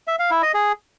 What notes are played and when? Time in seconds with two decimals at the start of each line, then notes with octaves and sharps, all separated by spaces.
0.08 E5
0.19 F5
0.31 E4
0.43 D#5
0.54 G#4